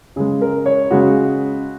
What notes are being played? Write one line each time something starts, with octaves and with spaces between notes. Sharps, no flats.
C#3 G#3 G#4
A#4
C#5
C#3 G#3 F#4